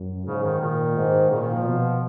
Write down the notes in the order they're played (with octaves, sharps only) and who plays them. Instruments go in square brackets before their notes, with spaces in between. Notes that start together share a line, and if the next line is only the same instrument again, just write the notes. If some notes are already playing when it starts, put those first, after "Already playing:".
Already playing: [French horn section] F#2
[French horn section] G#2 [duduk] C#3
[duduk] D#3
[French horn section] A#2 [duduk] D#3
[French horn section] G#2
[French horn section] A#2 [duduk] C#3
[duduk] D#3
F3
[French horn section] B2